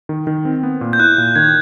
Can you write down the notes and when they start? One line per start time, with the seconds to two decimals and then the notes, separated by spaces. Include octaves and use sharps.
0.09 D#3
0.27 D#3
0.45 C4
0.63 B3
0.81 A#2
0.93 G6
0.99 E4 F#6
1.18 A#2
1.35 D#3 G#6